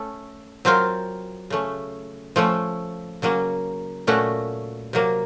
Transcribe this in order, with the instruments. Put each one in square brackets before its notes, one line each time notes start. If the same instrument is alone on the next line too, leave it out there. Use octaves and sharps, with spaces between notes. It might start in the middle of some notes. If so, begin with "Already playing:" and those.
Already playing: [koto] A3 C#4 A4
F#3 C4 F4 A#4
C#3 A3 C#4
F3 A3 C#4
C#3 F#3 A#3 C#4
A#2 A3 C#4 F#4
C3 F#3 A#3